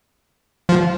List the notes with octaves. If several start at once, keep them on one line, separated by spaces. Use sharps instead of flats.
F3